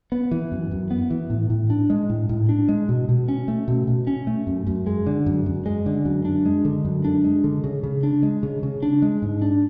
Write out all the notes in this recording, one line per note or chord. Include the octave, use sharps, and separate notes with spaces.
B3
E3
F#2
F#2
B3
E3
A2
A2
D4
G#3
A2
A2
D4
G#3
B2
B2
C#4
A3
B2
B2
C#4
A3
F#2
F#2
G#3
D3
F#2
F#2
G#3
D3
F#2
D4
G#3
D3
F#2
D4
G#3
D3
C#3
C#3
D4
G#3
C#3
C#3
D4
G#3
G#2
D4